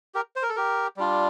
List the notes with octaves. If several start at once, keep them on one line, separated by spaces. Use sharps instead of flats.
G4 A#4
C5
A#4
A4
G4 A#4
G3 D4 F4